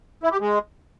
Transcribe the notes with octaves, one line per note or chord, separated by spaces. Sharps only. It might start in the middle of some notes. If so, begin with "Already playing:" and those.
E4
G4
G#3